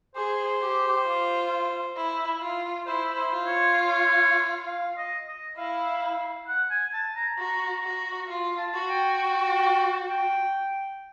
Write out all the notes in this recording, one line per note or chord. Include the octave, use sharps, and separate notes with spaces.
G#4 C5
G4
F4
E4
F4
E4 C5
C5
F4
C#5
C#5
F5
D#5
D#5
E4 F5
F#5
G#5
A5
A#5
F#4 A#5
F#4
F4
A5
F#4
G5
G5
G5